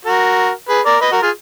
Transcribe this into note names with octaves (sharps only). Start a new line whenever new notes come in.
F#4 A#4
G#4 B4
A#4 D5
B4 D#5
F#4 A#4
F4 G#4